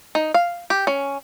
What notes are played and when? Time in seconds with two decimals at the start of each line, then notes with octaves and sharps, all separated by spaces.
0.15 D#4
0.34 F5
0.70 G4
0.87 C#4